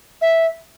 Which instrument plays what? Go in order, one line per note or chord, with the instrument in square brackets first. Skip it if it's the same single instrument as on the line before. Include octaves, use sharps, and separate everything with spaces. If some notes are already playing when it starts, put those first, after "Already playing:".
[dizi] E5